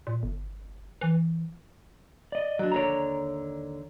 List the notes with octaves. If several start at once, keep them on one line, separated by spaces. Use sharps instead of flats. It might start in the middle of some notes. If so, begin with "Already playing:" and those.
A#2
G1
E3
D5 D#5
F#3 D4
D#2 D3 C#5 D5 A#5